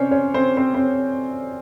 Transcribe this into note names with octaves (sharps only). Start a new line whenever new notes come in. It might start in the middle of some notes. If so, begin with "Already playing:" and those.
Already playing: C3 C#4 D4 C5 C#5
C#4 C#5
C4 C5
C4 C5
C4 C5